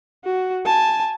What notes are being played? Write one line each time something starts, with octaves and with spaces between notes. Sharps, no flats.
F#4
G#5 A5